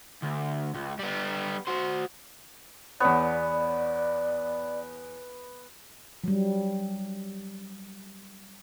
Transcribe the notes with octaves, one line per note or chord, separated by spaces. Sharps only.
D2
C#2
G3 B3
F#4 C5
E2 B3 C#5 D5
F#3 G3